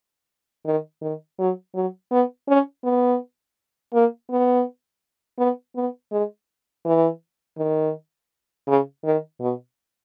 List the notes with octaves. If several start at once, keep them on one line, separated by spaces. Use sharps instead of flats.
D#3
D#3
F#3
F#3
B3
C#4
B3
A#3
B3
B3
B3
G#3
E3
D#3
C#3
D#3
B2